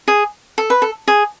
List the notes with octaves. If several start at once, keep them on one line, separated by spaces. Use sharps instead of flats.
G#4
A4
B4
A4
G#4